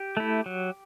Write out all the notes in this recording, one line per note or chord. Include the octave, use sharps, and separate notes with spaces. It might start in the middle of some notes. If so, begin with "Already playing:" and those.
Already playing: G4
A3 E4
F#3